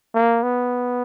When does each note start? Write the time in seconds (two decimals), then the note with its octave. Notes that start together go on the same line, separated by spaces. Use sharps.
0.14 A#3
0.43 B3